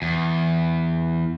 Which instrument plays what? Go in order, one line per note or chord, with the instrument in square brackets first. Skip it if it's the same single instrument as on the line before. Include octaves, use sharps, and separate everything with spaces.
[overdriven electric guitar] E2